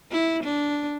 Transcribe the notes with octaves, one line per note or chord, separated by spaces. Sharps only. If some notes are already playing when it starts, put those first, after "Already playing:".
E4
D4